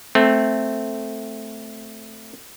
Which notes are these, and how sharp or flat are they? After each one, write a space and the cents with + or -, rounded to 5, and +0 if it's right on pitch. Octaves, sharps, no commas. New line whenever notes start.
A3 +0 C4 +0